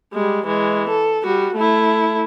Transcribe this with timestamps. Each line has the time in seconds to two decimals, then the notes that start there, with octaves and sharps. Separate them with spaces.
0.13 G3 G#3
0.46 E3 G#3
0.89 A4
1.24 G3 F#4
1.55 A3 E4